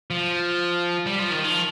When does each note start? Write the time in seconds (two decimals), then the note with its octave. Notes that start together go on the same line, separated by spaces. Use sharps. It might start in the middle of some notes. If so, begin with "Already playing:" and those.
0.11 F3
1.06 G3
1.19 F3
1.31 D#3
1.44 F3